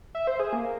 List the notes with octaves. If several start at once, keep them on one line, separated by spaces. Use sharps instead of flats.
E5
C5
G#4
A#3